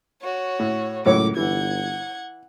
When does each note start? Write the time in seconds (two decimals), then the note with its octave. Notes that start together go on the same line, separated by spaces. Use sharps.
0.22 F#4 C#5
0.59 A2
1.06 C#2 F#2 A2 C#5 D6
1.37 G1 E3 F#5 G#6